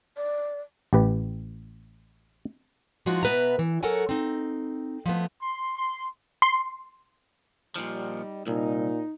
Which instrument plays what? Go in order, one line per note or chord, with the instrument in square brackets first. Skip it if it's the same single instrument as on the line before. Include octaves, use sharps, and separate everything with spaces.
[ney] D5
[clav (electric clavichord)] A1 G4 B4
[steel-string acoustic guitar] F3 G#3 D#4 F4 F#4
B2 B3 B4 E5 A#5
E3
F#3 A4 A#4 C#5 F#5 G#5
C4 D#4
F3 G#3 A3 B3
[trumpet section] C6
C6
[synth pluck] C6
[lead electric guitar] A#2 F3 [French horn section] G3 D#4
[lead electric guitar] C2 [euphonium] A#2 [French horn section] D#4